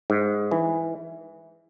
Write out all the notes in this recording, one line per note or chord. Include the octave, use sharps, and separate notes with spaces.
G#2
E3